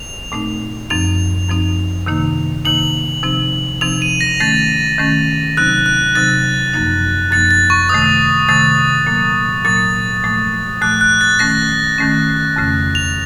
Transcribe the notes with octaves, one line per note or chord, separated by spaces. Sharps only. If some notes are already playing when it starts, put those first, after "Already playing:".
Already playing: F7
A#2 A3 C4 D#4
F#2 F3 C4 D#4 F7
F#2 F3 C4 D#4
C3 D#3 A#3 D#4
C3 D#3 A#3 D#4 F#7
C3 F3 C4 D#4
C3 F3 C4 D#4 F7
D#7
A#6
D#3 A3 C#4 A6
D#3 A3 C#4
C3 F#3 C4 D#4 F#6
F#6
C3 F#3 C4 D#4 A6
F#2 F3 A#3 D#4
F#2 F3 A#3 D#4 A6
A6
C#6
C3 D#3 A3 D#6
C3 D#3 A3 A6
A#2 F#3 A#3
A#2 F#3 A#3 A6
A#2 F3 A3
A#2 F3 A3 F#6
F#6
A6
D#3 A3 C#4 A#6
D#3 A3 C#4
F2 C#3 A3 C#4
F7